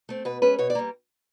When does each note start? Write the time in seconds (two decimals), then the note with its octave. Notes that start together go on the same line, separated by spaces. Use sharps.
0.09 A3 C4
0.25 B2 B4
0.42 G#3 C#4 B4
0.59 B2 C#5
0.70 D5
0.75 G3 A#3